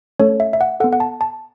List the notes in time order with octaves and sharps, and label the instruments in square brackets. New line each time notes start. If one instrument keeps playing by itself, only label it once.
[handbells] A3 C#4 A4 C#5
E5
E5
F#5
A4 F#5
B3
F#5
A5
A5